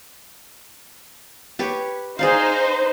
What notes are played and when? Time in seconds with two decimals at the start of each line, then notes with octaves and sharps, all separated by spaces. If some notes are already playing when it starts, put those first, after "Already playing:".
1.59 G4 B4 C#5
2.19 D#4 G#4 C5 D5 F5